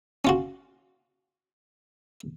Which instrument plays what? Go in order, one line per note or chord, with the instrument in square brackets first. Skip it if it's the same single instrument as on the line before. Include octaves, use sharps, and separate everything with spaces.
[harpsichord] C#4 F4 F#4